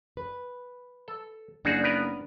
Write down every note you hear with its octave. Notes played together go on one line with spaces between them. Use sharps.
B4
A4
F#1 D4 D#4 F#4 G#4
B3 A#4 B4